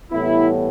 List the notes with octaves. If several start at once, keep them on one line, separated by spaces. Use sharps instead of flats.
A2 E3 G3 B3 E4